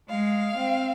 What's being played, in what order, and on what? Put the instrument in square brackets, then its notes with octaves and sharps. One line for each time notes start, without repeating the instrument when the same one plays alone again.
[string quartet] G#3 [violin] F5
[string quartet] C4